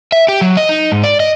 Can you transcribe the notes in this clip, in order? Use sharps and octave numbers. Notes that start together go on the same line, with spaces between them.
E5
G4
F#3
D#5
D#4
G#2
D5
D#5